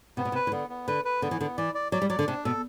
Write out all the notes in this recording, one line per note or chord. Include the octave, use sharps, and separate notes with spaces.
C3 B3
B2
C3
B4
E3
D3 B3
B3
D3 B4
B4
D3 B3
E3
D3 B3
E3 D5
D5
F#3 D5
G3
F#3 D5
D3
C3 D4
B2 A4